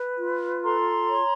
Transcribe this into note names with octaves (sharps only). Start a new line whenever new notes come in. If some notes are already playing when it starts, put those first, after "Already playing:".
Already playing: B4
F4
A4 A#5 C6
C#5